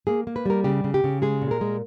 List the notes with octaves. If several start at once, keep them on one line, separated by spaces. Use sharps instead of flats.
A#3 G#4
A#3
B4
G3 A#4
C#3 G4
C#3
G4
C#3
G#3 G#4
A#2
A#4
G#3